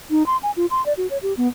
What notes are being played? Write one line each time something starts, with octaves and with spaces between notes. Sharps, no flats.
D#4
C6
G#5
F4
C6
D5
F#4
C#5
G4
B3